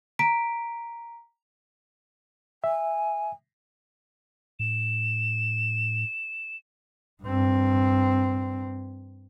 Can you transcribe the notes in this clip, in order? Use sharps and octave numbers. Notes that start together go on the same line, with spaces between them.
A#5 B6 D7
E5 G#5
A2 E7
G2 C4